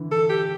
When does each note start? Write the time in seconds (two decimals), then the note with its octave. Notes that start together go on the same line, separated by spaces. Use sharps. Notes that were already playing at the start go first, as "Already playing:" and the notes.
Already playing: D3 E3
0.12 A4
0.30 G4